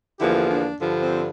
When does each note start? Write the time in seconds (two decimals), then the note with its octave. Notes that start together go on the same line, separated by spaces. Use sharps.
0.19 E2 D3 F3 A#3 E4 G4
0.49 D4
0.81 G2 D3 F3
1.02 C4